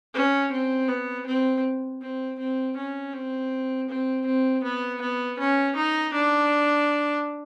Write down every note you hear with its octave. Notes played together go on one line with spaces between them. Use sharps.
C#4
C4
B3
C4
C4
C4
C#4
C4
C4
C4
B3
B3
C#4
D#4
D4